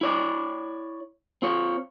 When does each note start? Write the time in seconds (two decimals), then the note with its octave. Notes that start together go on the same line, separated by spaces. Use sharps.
0.01 E4 C#5 D5
1.42 C4 F4 C#5